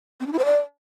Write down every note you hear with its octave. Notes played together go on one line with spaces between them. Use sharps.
C4
D4
E4
C5
D5